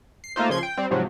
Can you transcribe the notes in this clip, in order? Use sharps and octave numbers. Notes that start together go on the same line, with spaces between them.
C7
A3 A#3 D#4 F4 C5
C#3 F3 C6 G#6
G5
G3 C4
G#2 C3 F3 F#3